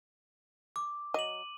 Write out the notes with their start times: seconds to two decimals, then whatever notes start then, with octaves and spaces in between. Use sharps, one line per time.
0.76 D6
1.14 F#3 D#5 D#7 F#7